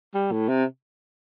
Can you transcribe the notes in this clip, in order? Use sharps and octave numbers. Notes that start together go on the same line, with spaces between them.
G3
A2
C3